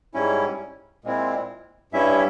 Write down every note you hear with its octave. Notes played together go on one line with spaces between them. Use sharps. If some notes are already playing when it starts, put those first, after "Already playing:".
G#2 G3 C#4 E4
A#2 G#3 C4 E4
G2 G3 C#4 E4 E5